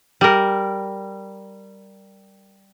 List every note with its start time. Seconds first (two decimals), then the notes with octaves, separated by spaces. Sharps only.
0.21 G3 A#4